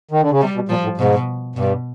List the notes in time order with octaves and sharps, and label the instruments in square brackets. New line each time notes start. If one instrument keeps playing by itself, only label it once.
[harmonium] D#3
D3
C#3
[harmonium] C3 [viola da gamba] G3
[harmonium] B2
[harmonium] A#2 [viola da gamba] F3
[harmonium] A2
[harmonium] G#2 [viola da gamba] B2
[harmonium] G2 [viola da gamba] B2